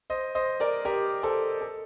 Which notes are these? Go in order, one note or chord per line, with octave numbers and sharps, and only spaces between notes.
C5 D#5
C5 D#5
A#4 D5
G4 A#4
A4 C5
A4